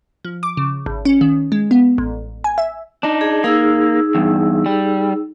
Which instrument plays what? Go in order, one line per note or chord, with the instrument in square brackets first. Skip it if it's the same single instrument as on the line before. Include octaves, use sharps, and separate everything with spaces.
[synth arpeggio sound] F3
D6
C#3
G#1
C#4
D#3
G#3
B3
A1
G#5
E5
[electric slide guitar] D4 D#4
[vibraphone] G#4
[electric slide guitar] A#3 [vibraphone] D#4 G#4 E6
[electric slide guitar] E2 G2
G3